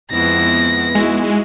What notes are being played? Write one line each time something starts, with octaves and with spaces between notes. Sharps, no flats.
F2 G#3 B3 E4 A#6
G#3 D#4 E4 F#4